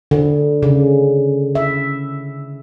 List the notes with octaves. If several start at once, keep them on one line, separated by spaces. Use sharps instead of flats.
D3
C#3
E5